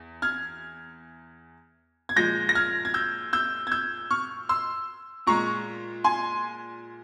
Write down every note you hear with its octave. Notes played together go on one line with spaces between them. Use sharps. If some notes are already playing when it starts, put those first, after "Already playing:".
Already playing: E2
F6 G#6
G#6
A#2 F3 G#3 G6 A#6
A#6
F6 G#6
G#6
E6 G6
E6 G6
G#6
E6 G6
C#6 F6
C6 E6
A#2 G#3 A#5 C#6
G#5 C6